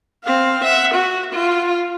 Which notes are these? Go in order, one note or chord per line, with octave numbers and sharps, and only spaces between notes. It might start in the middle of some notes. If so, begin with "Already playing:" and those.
C4 F5
E5 F#5
F#4
F4